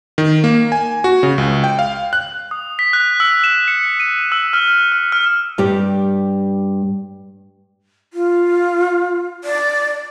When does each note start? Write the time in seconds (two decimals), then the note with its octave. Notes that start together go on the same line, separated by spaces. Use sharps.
0.18 D#3
0.44 A#3
0.72 G#5
1.04 F#4
1.23 C#3
1.38 C#2
1.64 G5
1.79 F5
2.13 F#6
2.51 D#6
2.79 B6
2.93 F#6
3.20 E6
3.44 E7
3.68 C#7
4.00 D#7
4.32 E6
4.53 F6
4.92 F6
5.12 F6
5.58 G2 G3 G4
8.13 F4
9.44 D5